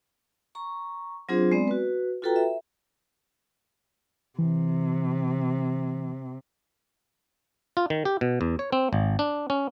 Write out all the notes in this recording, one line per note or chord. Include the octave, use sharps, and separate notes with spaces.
A#5 C#6
F#3 C4 D4 F4 G#4 C5
G#3 B3 C4 D5
F#4 B4
F4 F#4 A4 B4 G5 A#5
E5
C3 E3
F4
D#3
G4
B2
E2
C#5
C4
G#1
D4
C#4